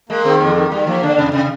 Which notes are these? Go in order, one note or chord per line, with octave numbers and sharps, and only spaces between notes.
G#3 A#3
D#3 C4
F2 A#3
D#3 A#3
D#3 G3
F3 A#3
D3 D4
F2 C3
C3